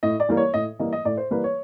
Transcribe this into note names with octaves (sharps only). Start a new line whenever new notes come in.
A2 D#5
D5
E3 G3 A#3
C#5
A2 D#5
E3 G3 A#3 D#5
D#5
A2 D5
C5
E3 G3 A#3 B4
C#5